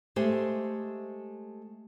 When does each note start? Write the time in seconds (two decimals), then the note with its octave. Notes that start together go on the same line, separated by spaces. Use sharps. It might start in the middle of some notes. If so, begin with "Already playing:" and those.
0.16 G#3 A3 G4 C5